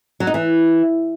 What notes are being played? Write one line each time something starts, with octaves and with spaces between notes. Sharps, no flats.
F#3
D#4
E3